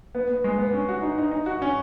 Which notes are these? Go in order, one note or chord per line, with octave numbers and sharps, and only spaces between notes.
B3
B3
G#3
B3
C#4
F#4
D#4
D#4
D#4
F#4
C#4